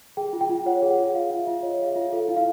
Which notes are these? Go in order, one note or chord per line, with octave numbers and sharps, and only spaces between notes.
G#4 G5
F4
G5
F4
C#5 F#5
G#4
F#5
F4
G#4 F5
F4
E5
F4
C#5 D#5
G#4 F5
E5
F4
A4 F5
E4
F5